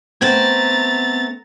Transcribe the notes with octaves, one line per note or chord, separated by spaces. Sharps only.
A3 B3 C4 A#5 A6